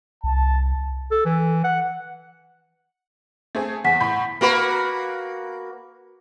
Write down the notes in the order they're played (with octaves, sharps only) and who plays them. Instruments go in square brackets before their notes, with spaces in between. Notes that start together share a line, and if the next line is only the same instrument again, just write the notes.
[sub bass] C2 [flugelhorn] A5
[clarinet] A4
E3
F#5
[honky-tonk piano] A3 C4 G#4
[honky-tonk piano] E2 [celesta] F#5 B6
[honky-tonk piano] A2 B5 G6
[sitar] A#3 F#4 B4